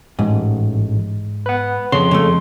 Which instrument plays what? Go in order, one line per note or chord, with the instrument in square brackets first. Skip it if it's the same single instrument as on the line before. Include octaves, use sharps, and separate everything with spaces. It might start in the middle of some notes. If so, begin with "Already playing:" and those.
[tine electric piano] A1 [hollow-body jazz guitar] G#2
[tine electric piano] B4 F#5
[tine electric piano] F2 C6 [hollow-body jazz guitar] C#3
[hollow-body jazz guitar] C#3 G#3 A3